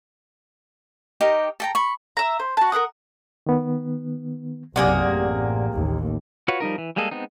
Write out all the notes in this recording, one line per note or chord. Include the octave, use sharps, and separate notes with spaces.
D#4 G4 A#4 G5
A4 G5 A#5
B5 C#6
E5 A#5
C5
F#4 A5
A#4 B4 F#5 D#6
D#3 B3
B1 F#2 C3 A#3 G#4 D5 F#5
A1
A1 D#2
F4 F#4 B4 C#5 C#6
F3 G3 D#4 A#4
E3
G3 G#3 A#3 G#4 A4
G#3 B3 C4 D#4